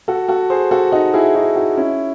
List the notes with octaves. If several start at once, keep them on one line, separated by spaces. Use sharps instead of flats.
F#4 A4
F#4 A4
G#4 C5
F#4 A4
D#4 F#4
E4 G#4
D#4 F#4
D#4 F#4
C#4 E4